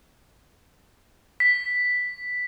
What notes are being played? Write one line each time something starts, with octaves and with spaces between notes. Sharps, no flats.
B6